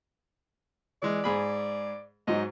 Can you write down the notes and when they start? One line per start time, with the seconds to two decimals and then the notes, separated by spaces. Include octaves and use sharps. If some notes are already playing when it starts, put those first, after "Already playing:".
1.02 E3 G#3 D5
1.24 G#2 G#4 B5
2.28 G#2 F#3 D#4 D#5